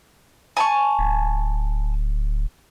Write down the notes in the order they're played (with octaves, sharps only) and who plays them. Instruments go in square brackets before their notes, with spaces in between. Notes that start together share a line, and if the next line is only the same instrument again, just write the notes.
[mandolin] G#5 A5 C#6
[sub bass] D1